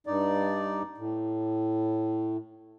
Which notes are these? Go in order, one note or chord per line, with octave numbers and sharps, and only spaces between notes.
G2 D#4 D5
A2